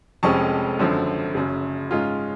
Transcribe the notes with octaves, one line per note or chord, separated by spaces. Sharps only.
F1 F2 F3 G#3 C#4 A5 C#6
G#1 F#2 D3 F3
F#1 F#2 C#3
G#2 G#3 C#4 F4